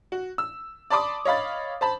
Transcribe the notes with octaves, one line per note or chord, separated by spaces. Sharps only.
F#4
E6
D5 A5 B5 C6 D6 D#6
C#5 D#5 F5 B5 A6
C5 A5 B5